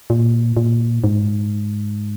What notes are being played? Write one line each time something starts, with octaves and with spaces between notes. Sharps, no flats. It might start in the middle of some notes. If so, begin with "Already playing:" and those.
A#2
A#2
G#2